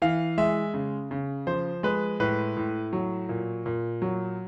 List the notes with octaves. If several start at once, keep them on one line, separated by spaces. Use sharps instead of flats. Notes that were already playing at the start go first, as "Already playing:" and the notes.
E3 F5
G#3 E5
C#3
C#3
F3 C5
G#3 B4
A2 B4
A2
F#3
A#2
A#2
F#3